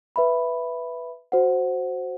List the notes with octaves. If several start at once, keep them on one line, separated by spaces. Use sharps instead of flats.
B4 E5 B5
F#4 C5 F#5